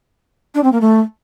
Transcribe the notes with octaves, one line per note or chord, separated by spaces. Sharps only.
D4
C4
A#3
A3